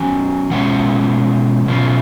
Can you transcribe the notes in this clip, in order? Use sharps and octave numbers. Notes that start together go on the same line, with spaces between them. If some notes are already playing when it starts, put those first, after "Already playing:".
Already playing: D#3 F#3 C#4 G#5
B2 G#3 C#4 F4 F#5
B2 F#3 C#4 F4